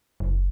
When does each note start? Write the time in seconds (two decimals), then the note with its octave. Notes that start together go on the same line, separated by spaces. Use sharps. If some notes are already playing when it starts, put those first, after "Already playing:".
0.20 F#1